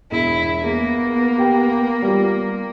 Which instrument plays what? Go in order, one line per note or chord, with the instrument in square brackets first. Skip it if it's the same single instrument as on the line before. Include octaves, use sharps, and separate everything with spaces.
[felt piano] E1 [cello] E4
[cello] A#3 [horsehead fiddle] B3 [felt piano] G#4
[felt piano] G4 G5
G3 F4